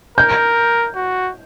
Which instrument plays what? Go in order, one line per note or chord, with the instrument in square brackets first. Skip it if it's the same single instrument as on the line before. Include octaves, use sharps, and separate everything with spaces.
[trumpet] A#4 [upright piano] G6
[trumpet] F#4